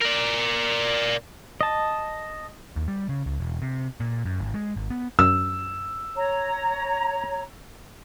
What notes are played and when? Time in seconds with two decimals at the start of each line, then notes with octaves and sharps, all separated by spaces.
0.01 A#4 D5
1.61 D#5 A5
2.76 D#2
2.88 G3
3.09 C#3
3.26 C#2
3.40 E1
3.62 C3
4.00 A#2
4.26 F#2
4.40 G#1
4.54 G#3
4.76 G#1
4.90 B3
5.19 F#2 E6
6.17 C#5 A#5